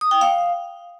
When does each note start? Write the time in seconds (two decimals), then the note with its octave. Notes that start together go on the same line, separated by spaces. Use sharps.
0.01 D#6
0.11 G5
0.21 F5